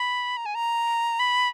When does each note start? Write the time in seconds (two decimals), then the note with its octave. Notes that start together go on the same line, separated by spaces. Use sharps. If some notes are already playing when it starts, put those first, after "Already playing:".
Already playing: B5
0.37 A#5
0.46 G#5
0.55 A#5
1.19 B5